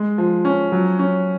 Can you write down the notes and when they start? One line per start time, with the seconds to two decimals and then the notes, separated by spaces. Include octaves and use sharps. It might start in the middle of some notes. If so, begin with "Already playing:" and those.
Already playing: G#3
0.18 F3
0.45 C#4
0.72 F#3
0.99 C#4